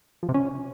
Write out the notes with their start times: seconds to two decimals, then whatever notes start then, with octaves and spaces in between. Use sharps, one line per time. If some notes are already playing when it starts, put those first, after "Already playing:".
0.23 F3
0.29 C3
0.34 C#4